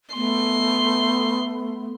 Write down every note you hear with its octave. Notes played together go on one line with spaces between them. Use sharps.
A3 B3 C6